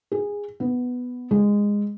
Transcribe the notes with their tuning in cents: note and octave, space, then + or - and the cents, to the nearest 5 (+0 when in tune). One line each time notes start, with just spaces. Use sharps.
G#4 -15
B3 +5
G#3 -15